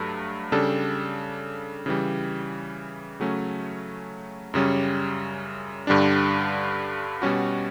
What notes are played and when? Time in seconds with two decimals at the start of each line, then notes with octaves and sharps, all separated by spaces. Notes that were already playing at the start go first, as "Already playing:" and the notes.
Already playing: G2 F#3 A3
0.52 C#3 G3 D4 A4
1.86 C#3 E3 G3
3.20 C#3 F#3 A3 C#4
4.54 F#2 C#3 G3 C#4
5.87 G2 D3 G3 D4
7.22 B2 G3 C#4 F#4